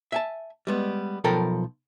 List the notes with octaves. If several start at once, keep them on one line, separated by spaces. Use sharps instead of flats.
E5 G#5 A5
G3 G#3 B3
B1 F3 A4 A#4 G5 B5